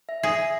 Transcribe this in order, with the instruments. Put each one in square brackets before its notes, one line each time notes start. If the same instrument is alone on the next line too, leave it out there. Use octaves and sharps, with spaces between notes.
[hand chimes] E5
[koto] G#4 [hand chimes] E5
[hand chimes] E5